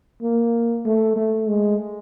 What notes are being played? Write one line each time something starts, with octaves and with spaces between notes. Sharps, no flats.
A#3
A3
A3
G#3